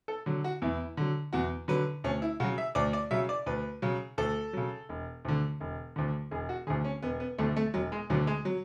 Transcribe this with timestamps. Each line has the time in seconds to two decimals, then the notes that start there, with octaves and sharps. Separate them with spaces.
0.08 A4
0.26 D3 F#3
0.44 F#4
0.62 E2 E4
0.97 D3 F#3
1.33 E2 F#4
1.68 D3 F#3 B4
2.04 D2 C#4
2.22 E4
2.40 C#3 F#3 F#4
2.58 E5
2.75 D2 D5
2.93 D5
3.11 C#3 F#3 E5
3.29 D5
3.46 D2 B4
3.82 C#3 F#3
4.18 D2 A4
4.53 C#3 F#3
4.89 E1
5.25 D2 D3
5.60 E1
5.96 D2 D3
6.31 E1 G#4
6.49 F#4
6.67 D3 G#4
6.70 D2
6.84 C#4
7.02 E1 B3
7.20 B3
7.38 D2 D3 A3
7.57 A3
7.74 E1 F#3
7.92 G#3
8.10 D2 D3 F#3
8.27 G#3
8.45 F#3